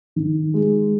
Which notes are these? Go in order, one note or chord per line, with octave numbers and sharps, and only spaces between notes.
D#3
G#3